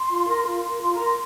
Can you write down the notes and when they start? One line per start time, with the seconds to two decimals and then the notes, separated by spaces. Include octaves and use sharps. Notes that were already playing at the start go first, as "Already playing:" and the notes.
Already playing: C6
0.10 F4
0.27 A#4
0.45 F4 C6
0.63 A#4 C6
0.82 F4 C6
0.93 A#5
0.99 A#4
1.05 C6